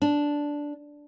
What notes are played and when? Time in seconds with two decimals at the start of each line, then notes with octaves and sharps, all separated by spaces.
0.02 D4